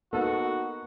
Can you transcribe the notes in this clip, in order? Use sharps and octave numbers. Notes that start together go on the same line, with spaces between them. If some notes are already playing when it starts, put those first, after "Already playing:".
A#3 B3 D#4 F#4 A4